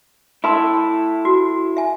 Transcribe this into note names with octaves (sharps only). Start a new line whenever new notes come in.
E4 A4 C6
F#4
E5 G#5